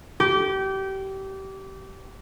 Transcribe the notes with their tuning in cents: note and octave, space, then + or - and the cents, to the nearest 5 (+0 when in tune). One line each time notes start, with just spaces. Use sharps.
G4 -25